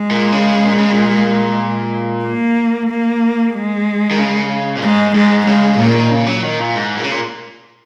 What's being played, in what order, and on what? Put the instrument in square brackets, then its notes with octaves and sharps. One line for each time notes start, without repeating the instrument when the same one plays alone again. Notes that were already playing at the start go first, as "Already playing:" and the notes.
Already playing: [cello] G#3
[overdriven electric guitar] A#2
C#3
A#2
C#3
A#2
[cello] A#3
A#3
G#3
[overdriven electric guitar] D#3
C#3
A#2
[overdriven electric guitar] G#2 [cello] G#3
[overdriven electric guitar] G#2 [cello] G#3
[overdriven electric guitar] C#3 [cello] G#3
[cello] A#2 [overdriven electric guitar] D#3
[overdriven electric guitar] C#3
F#3
D#3
A#2
G#2
A#2
C#3
A#2